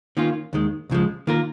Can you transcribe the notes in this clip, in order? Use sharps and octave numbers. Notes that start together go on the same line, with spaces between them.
D#3 A#3 C#4 F4
D#2 D#3 G#3
C#2 C#3 F3 G#3
D#3 A#3 F4 A#4